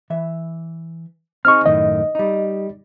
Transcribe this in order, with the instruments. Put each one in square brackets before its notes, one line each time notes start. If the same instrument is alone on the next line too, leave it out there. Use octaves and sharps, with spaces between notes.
[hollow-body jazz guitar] E3 E5
[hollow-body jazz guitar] C4 D#4 G#4 [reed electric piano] C#6 F6
[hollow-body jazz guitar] F#2 A2 D#3 [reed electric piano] D#5
[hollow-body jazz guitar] G3 D#4